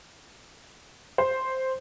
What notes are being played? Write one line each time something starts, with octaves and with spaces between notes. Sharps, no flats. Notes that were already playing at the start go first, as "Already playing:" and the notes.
C5